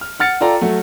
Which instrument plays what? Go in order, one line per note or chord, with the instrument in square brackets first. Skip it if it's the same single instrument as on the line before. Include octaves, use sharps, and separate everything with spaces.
[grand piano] F6
F#5 F6 A6 C#7
F4 A4 D5 G5 A#5
F#3 A3